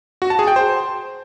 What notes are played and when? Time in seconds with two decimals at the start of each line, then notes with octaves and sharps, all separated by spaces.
0.22 F#4
0.30 A5
0.39 G#4
0.47 G5
0.56 C5